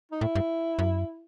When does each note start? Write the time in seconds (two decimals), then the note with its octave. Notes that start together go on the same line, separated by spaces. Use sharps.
0.11 D#4
0.21 A2 E4
0.35 G2
0.79 F#2